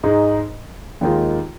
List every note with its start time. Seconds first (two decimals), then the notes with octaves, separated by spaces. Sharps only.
0.03 G#2 G#3 D#4
1.01 D#2 D#3 G#3 F4